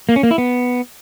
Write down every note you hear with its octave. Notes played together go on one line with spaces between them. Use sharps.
A#3
C#4
A#3
E4
B3